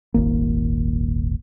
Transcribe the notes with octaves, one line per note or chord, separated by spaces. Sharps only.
D#1 G#1 A#3